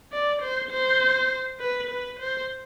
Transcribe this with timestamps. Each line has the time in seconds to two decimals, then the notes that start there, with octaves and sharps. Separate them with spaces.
0.12 D5
0.42 C5
0.71 C5
1.60 B4
1.90 B4
2.19 C5